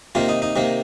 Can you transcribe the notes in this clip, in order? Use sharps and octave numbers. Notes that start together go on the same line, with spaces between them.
C3 D#3 A#3 F4
D#4
D#4
C3 D#3 A#3